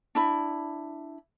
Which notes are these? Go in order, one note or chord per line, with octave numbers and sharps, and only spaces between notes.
D4 E4 B5